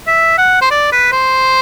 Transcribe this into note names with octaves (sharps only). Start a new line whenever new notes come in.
E5
F#5
C5
D5
B4
C5